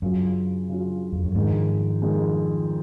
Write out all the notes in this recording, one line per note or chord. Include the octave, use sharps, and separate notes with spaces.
F#2 C#3 F#3 C#4 F4
C#3 F#3 C#4 F4
F2
F#2
F2 G#2 D#3 G#3
F2 D#3 G#3